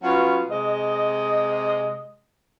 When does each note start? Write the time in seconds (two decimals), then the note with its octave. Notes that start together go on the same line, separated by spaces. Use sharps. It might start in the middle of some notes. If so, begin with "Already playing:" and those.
0.03 F#3 B3 C#4 F4
0.49 C3 G#3 D#5